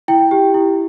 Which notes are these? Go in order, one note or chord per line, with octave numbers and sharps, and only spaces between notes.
E4 G5
G4
E4